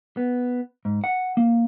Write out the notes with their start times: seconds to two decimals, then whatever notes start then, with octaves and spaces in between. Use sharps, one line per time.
0.17 B3
0.85 G#2
1.04 F#5
1.37 A#3